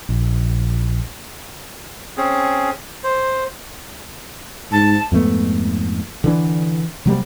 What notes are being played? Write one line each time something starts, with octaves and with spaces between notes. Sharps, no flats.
A#1
C4 C#4 G#4
C5
G#2 A5
F2 G#2 A3 B3
D3 E3 D4
C3 F#3 G3 A#3